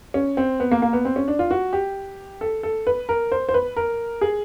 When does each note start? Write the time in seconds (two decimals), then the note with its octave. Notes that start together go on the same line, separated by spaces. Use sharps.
0.14 C#4
0.37 C4
0.60 B3
0.71 A#3
0.82 A#3
0.93 B3
1.05 C4
1.16 C#4
1.28 D4
1.39 F4
1.51 F#4
1.73 G4
2.41 A4
2.63 A4
2.87 B4
3.09 A#4
3.32 C5
3.49 C5
3.54 B4
3.77 A#4
4.21 G#4